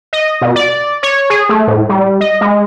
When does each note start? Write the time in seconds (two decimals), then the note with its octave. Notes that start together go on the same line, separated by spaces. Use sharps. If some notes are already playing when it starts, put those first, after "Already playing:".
0.13 D#5
0.41 B2
0.56 D5
1.03 C#5
1.30 G#4
1.49 A3
1.68 A2
1.89 G3
2.21 D#5
2.41 G#3